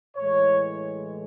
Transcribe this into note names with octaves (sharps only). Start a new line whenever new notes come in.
A2 E3 G#3 C#5